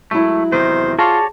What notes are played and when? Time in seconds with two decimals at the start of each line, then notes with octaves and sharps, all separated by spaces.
0.11 F#3 G#3 A3 E4
0.52 E2 C3 D#3 C5
0.99 F4 F#4 G#4 C#5 D5 A5